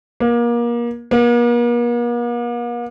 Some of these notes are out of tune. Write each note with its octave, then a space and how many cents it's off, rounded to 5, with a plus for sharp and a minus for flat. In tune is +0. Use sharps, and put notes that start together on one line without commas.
A#3 +30
A#3 +45